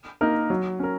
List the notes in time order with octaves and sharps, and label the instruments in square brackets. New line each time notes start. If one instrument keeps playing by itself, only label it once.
[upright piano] A#3 D#4 A#4
F#3
C#4 A#4